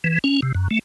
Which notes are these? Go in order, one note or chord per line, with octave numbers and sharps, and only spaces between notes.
E3
C#4
C3
F#2
A3